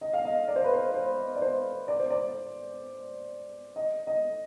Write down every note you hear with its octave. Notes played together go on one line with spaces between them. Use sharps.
D#5
F5
D#5
D5
C5
B4
C5
C5
D5
C5
D5
C5
D5
D#5
D#5